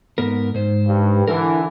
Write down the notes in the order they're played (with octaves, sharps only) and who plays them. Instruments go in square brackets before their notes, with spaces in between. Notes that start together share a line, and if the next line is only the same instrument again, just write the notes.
[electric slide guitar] G#2 B3 A#4
G#2 C5
[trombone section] G2
[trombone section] D3 E3 [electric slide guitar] D4 E4 A#4